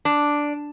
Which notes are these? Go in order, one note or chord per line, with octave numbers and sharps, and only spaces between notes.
D4